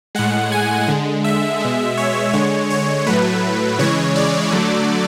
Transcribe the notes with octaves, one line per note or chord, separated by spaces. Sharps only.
A2 G#3 F#5
G#5
D3 G#3
E5
B2 G#3
C#5
D3 G#3 C#5
C#5
A2 F#3 A3 B4
C#3 E3 G#3 C#5
D5
D3 F#3 A3